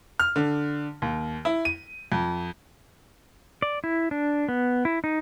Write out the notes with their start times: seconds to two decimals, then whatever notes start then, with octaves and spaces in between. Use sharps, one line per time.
0.20 F6
0.36 D3
1.02 D#2
1.45 E4
1.65 D#7
2.12 F2
3.62 D5
3.84 E4
4.11 D4
4.49 B3
4.85 E4
5.04 D#4